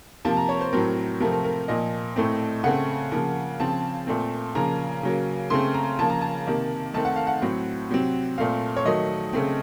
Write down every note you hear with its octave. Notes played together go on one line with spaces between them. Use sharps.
C3 F3 A#3 A5
A#5
C#5
C5
A2 F#3 C4 A#4
C3 F3 A3 C4 A#4
A#4
A#4
A#2 F3 A#3 D#5
A2 A3 C4
C#3 A3 C4 F#5
C#3 F3 A#3
C#3 F3 C4 A5
A#2 A3 C4
C#3 F3 A#3 A#5
C#3 F#3 A#3
C#3 A3 C4 C6
A#5
C#3 F3 A#3 A5
A#5
A5
C3 D#3 A#3
D#3 A3 C4 A5
F#5
F5
F#5
A2 F#3 C4
C3 F#3 C4
A#2 A3 C4 F5
C#5
D#3 F#3 A3 D#5
C#3 A3 C4